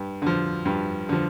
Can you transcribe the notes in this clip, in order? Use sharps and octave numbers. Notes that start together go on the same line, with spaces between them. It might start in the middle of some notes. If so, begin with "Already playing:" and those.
Already playing: G2
D3 F3
G2
D3 F3